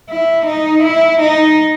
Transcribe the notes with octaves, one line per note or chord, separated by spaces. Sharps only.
E4
D#4
E4
D#4